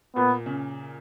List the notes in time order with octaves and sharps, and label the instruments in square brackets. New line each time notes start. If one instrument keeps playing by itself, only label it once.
[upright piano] A#2 [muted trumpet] B3
[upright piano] C#3